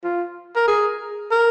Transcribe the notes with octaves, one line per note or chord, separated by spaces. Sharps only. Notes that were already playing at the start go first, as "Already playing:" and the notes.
F4
A#4
G#4
A#4